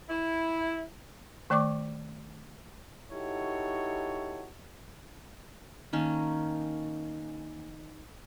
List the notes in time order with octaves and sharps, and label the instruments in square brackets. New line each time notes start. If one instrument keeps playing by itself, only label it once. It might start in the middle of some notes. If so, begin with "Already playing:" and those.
[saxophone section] E4
[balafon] D#3 A3 D5 C#6 D6
[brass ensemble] D#4 E4 F#4 G4 A4 C#5
[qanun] D#3 A#3 C#4 A5